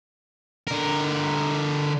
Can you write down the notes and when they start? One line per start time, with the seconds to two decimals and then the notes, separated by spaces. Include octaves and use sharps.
0.67 D3 A#4